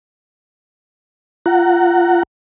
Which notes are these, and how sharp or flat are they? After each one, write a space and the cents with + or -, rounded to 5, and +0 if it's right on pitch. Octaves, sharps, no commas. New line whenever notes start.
F4 -15 F#5 +15 A#5 -20